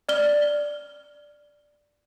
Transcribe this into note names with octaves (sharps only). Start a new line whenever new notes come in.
D5 F6 G7